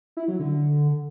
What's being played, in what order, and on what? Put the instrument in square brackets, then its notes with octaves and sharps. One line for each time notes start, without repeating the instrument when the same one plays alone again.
[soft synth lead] E4
F#3
D3